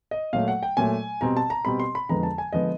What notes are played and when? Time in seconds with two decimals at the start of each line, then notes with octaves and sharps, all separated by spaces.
0.11 D#5
0.33 A#2 F#3 A3 F5
0.48 F#5
0.63 G5
0.77 A#2 F#3 A3 G#5
1.21 B2 G3 C4 A#5
1.37 A5
1.50 A#5
1.65 B2 G3 C4 B5
1.79 C6
1.95 B5
2.09 F2 D3 F3 G#3 B3 A#5
2.23 A5
2.38 G#5
2.53 D3 F3 G#3 B3 D#5